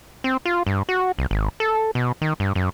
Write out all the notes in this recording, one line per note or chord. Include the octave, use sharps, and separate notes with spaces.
C4
F4
G2
F#4
C2
G#1
A4
B2
D#3
G2
F#2